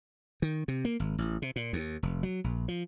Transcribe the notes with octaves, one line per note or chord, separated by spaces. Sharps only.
D#3
C3
A#3
G#1
A1
C3
A#2
D#2
F1
F#3
A#1
F3